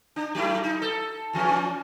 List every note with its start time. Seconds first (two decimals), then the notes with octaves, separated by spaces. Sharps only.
0.16 D4
0.35 F#3 A3 E4
0.64 D#4
0.82 A4
1.33 E2 F3 C#4
1.48 F3 C#4